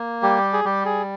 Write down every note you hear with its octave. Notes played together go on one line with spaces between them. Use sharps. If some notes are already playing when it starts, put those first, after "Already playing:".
Already playing: A#3
G3 G4
G#4
G3 G4
G#4